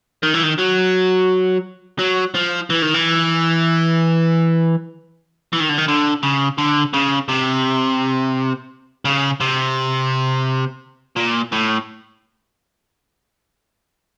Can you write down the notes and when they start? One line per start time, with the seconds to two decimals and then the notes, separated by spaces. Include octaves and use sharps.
0.23 D#3
0.34 E3
0.43 D#3
0.58 F#3
1.99 F#3
2.34 F3
2.70 E3
2.82 D#3
2.94 E3
5.53 E3
5.60 D#3
5.69 D3
5.78 D#3
5.88 D3
6.23 C#3
6.58 D3
6.93 C#3
7.28 C3
9.05 C#3
9.41 C3
11.17 A#2
11.52 A2